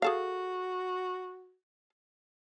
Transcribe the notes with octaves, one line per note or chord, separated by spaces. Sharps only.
F#4 G#4 A4 F5